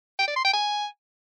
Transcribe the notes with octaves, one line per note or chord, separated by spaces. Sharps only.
G5
D5
C6
G5
G#5